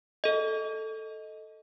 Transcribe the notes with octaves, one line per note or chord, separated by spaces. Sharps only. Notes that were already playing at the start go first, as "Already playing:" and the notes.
A4 D#5